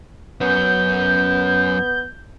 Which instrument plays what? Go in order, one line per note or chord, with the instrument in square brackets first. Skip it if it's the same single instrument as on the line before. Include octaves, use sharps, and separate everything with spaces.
[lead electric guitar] F#2 C#4 [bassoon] B3 [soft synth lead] G6